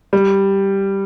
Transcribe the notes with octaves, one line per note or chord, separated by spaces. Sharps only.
G3